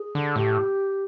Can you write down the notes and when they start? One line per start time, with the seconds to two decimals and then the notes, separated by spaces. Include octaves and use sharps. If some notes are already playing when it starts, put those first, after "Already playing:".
Already playing: G#4
0.15 D3
0.36 A2 G4